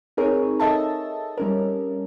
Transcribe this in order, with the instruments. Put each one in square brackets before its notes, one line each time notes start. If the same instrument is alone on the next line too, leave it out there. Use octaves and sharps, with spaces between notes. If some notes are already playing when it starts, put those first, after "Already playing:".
[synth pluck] C4 D#4 G#4 A#4 C#5
A4 D#5 E5 A5
G3 C#4 A#4